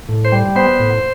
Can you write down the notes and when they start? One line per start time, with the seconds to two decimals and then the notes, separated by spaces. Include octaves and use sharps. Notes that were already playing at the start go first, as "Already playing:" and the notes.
0.09 A2
0.25 C5
0.32 G3
0.56 B3 C5
0.80 A2